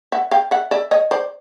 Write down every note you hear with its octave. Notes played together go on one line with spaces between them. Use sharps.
E5 F#5
F5 G5
E5 F#5
D5 E5
C#5 D#5
C5 D5